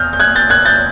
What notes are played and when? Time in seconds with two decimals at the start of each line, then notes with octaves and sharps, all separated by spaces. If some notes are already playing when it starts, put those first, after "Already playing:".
Already playing: E2 F6 G6
0.13 G6
0.20 F#6 G#6
0.35 G6 A6
0.50 F#6 G#6
0.65 G6 A6